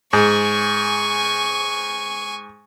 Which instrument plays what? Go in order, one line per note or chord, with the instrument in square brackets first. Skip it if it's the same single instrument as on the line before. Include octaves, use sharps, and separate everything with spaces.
[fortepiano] G#2 [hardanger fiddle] G#5 C#6